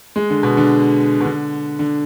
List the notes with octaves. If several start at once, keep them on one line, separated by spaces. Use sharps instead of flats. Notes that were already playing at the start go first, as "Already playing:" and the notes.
G#3
D3
B2
D3
B2
D3
D3